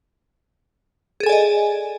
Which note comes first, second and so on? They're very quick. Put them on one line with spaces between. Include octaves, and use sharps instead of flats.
G#4 A4 G#5 D5 D#5